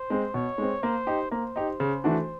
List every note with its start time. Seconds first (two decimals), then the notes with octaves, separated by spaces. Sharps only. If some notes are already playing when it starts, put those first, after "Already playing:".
Already playing: C5
0.10 G#3 C4
0.34 B2 C#5
0.58 G#3 C4
0.83 A#3 C5
1.07 D#4 G4
1.31 A#3 C5
1.56 D#4 G4
1.80 C#3
2.04 E3 A3 D4 F#4